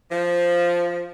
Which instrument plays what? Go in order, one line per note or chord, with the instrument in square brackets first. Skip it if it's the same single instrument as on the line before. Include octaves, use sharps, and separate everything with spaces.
[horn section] F3